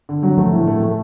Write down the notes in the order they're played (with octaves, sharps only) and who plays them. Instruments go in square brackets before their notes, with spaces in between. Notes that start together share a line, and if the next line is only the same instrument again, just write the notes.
[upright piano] D3
F#3
[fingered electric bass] F3 [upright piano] A3
[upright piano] A2
A3
A3